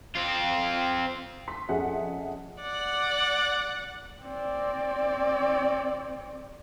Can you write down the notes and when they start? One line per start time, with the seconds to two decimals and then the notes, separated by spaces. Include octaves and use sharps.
0.15 C4 F4
1.48 C6 B6
1.69 F2 C#4 G#4 E5 F#5
2.62 D5 F#5
4.23 C4 D5